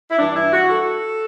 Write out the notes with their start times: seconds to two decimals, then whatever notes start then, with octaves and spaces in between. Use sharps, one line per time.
0.10 E4
0.18 G2 E3 D4
0.35 E4
0.52 F#4
0.68 A4